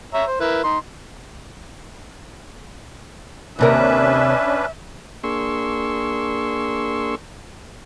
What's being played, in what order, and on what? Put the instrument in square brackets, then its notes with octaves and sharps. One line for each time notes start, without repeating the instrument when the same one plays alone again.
[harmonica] C#5 E5 A#5
C5
E4 A#4 B4
D#4 C6
[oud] D#2 C3 A#4 [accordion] C#4 D4 B4 [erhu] E5
[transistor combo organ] A#3 D4 G#4 C6 C#6 E6